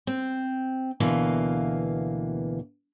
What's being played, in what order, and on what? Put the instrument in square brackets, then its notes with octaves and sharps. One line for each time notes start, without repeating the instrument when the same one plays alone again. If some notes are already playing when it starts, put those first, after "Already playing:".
[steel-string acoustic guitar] C4
D2 B2 E3 A#3 F5